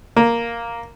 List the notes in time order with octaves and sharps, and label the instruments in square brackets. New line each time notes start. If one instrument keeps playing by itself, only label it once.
[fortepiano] A#3